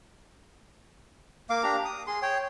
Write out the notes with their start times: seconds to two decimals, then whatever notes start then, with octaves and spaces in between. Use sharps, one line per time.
1.50 A#3 F5 D6
1.63 D4 G4 A#5
1.85 D#6
2.07 G#4 C6
2.22 C#5 G5